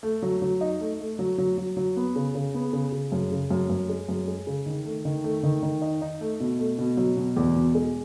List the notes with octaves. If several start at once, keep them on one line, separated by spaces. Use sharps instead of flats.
A3
F#3
F#3
D#4
A3
A3
F#3
F#3
F#3
F#3
B3
C#3
C#3
B3
C#3
C#3
F#2
C#3
F#2
F#2
G#3
F#2
G#3
C#3
D#3
A3
D#3
A3
D#3
D#3
D#4
D#4
A3
B2
A3
B2
F#3
B2
E2
B2
G#3